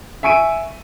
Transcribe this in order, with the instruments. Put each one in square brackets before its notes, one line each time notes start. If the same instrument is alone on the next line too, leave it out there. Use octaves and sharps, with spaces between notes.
[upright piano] E5 G#5 C#6 D7 D#7